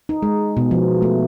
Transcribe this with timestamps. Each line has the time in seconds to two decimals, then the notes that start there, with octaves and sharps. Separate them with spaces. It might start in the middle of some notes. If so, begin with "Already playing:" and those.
0.09 D#4
0.23 G#3
0.57 B2
0.71 F3
1.02 A3